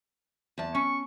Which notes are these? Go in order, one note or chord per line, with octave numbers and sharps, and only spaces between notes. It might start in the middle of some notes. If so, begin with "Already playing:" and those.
E2 A5
C#4 C#6